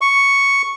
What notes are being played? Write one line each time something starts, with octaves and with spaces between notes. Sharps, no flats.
C#6